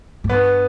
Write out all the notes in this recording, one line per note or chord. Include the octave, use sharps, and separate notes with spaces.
G#2
G2 B3